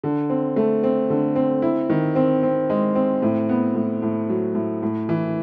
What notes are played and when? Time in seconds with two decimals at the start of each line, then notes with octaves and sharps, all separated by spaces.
0.04 D3
0.30 C4
0.56 A3
0.83 C4
1.10 D3
1.36 C4
1.62 E4
1.90 D#3
2.16 C4
2.43 C4
2.70 G#3
2.95 C4
3.22 A2
3.49 B3
3.75 A2
4.02 A2
4.29 F#3
4.55 A2
4.82 A2
5.09 E3